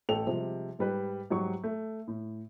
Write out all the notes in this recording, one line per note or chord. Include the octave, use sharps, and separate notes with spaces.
A1 A4 G5 F7
C3 F3 G3 G#3
G#2 G3 B4
G#2 F#3 G3 C#6
A3
A2